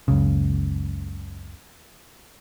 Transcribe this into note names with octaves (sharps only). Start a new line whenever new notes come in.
F#1 C#2 C#3